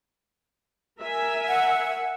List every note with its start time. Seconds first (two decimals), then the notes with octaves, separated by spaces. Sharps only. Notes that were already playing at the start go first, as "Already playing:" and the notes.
1.00 A#4 E5 G#5
1.48 F#5